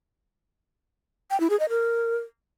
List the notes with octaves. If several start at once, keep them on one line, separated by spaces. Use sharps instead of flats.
G5
E4
G#4
D#5
A#4